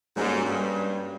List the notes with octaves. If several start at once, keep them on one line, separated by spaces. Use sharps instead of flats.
G#2 G3 A#3 C#4 F#4 A4
G2